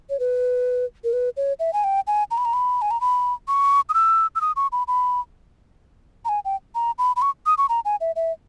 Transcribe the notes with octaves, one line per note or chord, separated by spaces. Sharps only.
C#5
B4
A#4
B4
C#5
E5
G#5
G5
G#5
A#5
B5
A#5
B5
G#5
A#5
B5
C#6
D#6
E6
E6
D#6
C#6
B5
B5
A#5
G#5
G5
A#5
B5
B5
C#6
D#6
C#6
A#5
G#5
E5
E5